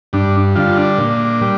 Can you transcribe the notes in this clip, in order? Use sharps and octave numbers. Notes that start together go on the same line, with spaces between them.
G2 D4
D3 G3 F4
D4
A#2
G3